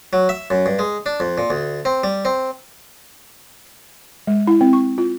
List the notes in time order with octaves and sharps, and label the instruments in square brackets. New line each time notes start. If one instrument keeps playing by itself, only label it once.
[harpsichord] F#3
E5
F#2
G2
G#3
D4
F2
A#2
D2
C4
G3
C4
[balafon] G#3
E4
C4
C#6
F4